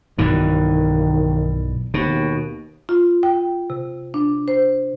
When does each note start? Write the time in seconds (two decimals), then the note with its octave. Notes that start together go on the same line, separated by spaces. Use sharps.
0.18 B1 G2 D#3 E3
1.94 D#2 B2
2.89 F4
3.23 G5
3.70 C3
4.14 D4
4.48 C5